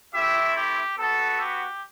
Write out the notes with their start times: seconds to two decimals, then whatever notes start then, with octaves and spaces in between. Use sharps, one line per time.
0.13 A3 C4 E4 G4 E5
0.56 G4
0.97 B3 F#4 A4
1.39 G4